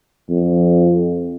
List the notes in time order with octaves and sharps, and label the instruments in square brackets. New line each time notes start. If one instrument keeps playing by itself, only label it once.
[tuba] F2